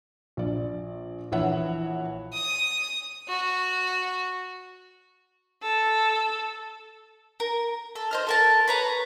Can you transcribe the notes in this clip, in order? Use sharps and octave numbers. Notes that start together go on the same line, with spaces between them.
A#1 D5
A#1 E3 E4 C#5 E5 F#5
D#6
F#4
A4
A#4
A4
C5 D#5 F6
A4 A#4 A5
B4 C#5 A#5